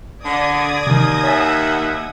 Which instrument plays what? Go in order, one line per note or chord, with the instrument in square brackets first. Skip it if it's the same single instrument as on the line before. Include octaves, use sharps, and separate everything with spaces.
[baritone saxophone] D3 [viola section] D5 [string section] D#6 G#6 A#6
[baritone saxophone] D#2 [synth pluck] C3 D#3
[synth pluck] C#5 G#5 A6 [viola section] E5 F#5